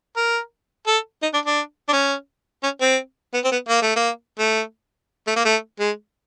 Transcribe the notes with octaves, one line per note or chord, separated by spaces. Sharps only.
A#4
A4
D#4
D4
D4
D4
C#4
C#4
C4
B3
C4
B3
A#3
A3
A#3
A3
A3
A#3
A3
G#3